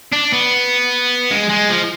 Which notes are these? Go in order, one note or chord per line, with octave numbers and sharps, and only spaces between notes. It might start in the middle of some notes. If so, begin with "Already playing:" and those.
D4
B3
G#3
G#3
F3